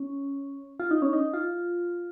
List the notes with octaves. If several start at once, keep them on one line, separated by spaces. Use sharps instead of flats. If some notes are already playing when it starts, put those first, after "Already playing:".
Already playing: C#4
F4
D#4
C#4
D#4
F4